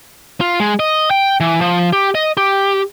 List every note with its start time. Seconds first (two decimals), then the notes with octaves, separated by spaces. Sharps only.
0.41 F4
0.60 G#3
0.80 D#5
1.11 G5
1.40 E3
1.61 F3
1.93 G4
2.15 D#5
2.37 G4